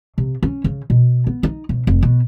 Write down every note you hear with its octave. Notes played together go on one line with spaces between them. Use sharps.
C3
C#4
C#3
B2
B3
D#4
B1
F1
B2